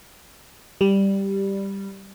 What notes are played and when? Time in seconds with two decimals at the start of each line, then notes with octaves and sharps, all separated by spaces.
0.81 G3